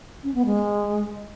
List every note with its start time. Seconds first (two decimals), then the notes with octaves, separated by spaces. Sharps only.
0.24 C#4
0.35 B3
0.45 G#3